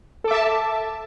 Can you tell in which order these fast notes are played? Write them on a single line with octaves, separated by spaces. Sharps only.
A4 D6 E5 A5